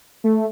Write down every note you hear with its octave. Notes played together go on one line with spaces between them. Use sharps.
A3